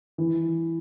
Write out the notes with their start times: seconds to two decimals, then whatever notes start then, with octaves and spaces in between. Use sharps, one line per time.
0.18 E3